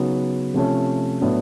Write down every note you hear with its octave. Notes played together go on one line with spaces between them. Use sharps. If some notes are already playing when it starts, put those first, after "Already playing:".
Already playing: C#3 F#3 B3 D#4
C3 F3 A3 C#4
A2 F#3 B3 D4